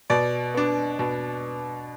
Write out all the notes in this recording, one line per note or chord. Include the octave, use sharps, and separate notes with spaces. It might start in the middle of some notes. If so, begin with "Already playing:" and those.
B2 D5
B3 D4
B2